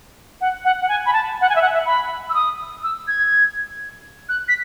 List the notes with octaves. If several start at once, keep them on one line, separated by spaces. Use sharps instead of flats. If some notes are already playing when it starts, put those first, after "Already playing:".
F#5
F#5
F#5
G#5
B5
A5
F#5
G#5
E5
F#5
E5
B5
E6
D#6
E6
G#6
F#6
B6